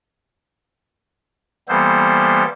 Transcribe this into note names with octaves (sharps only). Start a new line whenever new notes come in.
E3 G3 A#3 B3 A4 C5